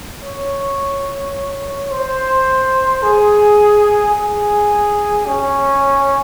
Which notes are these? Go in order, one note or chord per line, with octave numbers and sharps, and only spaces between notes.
C#5
C5
G#4
G#4
C#4